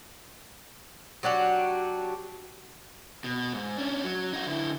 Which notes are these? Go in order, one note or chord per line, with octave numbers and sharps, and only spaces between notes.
F#3 D4 F#4 G4
B2
G#2
C#4 D4
F#3
D#4 F#4
D3 E4